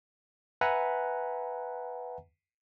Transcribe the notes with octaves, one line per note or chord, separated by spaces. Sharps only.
B4 E5 F#5 G#5 A#5